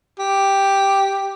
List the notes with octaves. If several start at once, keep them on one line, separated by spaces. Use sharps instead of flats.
G4